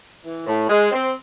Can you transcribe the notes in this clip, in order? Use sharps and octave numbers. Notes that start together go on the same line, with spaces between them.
E3
A2
G#3
C4